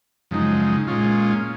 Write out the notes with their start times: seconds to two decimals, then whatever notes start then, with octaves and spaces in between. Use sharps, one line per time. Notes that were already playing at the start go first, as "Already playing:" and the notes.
0.31 F#2 C#3 F3 G#3 D#4
0.87 A#2 G#3 C#4 F4